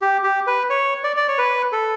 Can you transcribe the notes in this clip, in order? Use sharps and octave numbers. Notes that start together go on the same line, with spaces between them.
G4
G4
B4
C#5
D5
D5
C#5
B4
A4